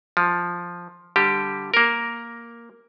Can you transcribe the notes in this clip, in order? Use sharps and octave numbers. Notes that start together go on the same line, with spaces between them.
F3
D3 G3 G4
A#3 A#4